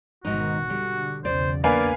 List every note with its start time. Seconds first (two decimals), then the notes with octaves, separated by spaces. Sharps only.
0.25 G#1 G#2 B2 D#3 D#4 F#4
0.70 D3 G3
1.25 B1 E2 C#3 C5 D5
1.64 A#3 B3 D4 B4 D5 F5 G#5